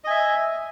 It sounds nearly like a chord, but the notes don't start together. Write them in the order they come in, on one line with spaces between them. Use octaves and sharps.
D#5 G#5 E5